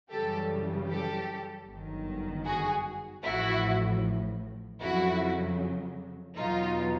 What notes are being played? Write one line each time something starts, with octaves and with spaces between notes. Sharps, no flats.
F#2 C#3 E3 G3 G4 A4
G4 A4
G1 F#2 D#3
F#4 G#4
A1 A2 F3 E4 F#4
F2 C#3 F#3 E4 F#4
E2 B2 F#3 D#4 F4